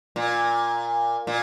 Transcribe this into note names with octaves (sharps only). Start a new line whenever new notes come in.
A#2
A#2